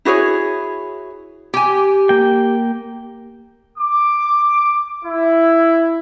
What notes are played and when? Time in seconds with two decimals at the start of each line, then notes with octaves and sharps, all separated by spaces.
0.05 E4 F#4 G#4 C#5
1.54 G4 G#5
2.09 A#3 G5
3.79 D6
5.04 E4